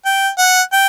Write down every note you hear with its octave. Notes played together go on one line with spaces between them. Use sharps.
G5
F#5
G5